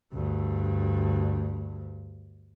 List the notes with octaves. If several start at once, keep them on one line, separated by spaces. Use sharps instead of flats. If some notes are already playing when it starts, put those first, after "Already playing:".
D2 G2